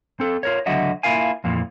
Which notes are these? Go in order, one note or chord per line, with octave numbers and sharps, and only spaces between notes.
C4 A4
F4 A#4 C#5
C#2 D3 F#3 F#4 D#5 E5
A#3 E4 F4 A#4 F5 G#5
F2 A#2 E3 F3